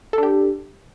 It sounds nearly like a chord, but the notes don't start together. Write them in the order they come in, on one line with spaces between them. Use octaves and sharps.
A4 D4 G4